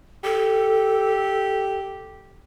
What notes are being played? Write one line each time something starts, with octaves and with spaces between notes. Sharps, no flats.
G4 A4